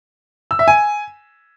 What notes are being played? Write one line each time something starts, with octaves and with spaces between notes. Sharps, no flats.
E6
E5
G#5